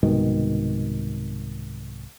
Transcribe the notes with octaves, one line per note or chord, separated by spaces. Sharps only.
C2 G#2 B2 D#3